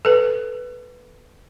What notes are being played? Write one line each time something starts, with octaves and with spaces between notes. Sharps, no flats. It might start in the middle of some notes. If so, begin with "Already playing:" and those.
A4 B4